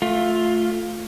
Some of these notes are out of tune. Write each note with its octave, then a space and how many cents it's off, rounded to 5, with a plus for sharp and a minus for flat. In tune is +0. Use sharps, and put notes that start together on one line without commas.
A3 +0 F4 +10